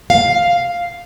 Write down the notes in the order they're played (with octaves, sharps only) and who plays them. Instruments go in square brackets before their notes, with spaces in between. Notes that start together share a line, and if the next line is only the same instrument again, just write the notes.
[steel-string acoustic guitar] F5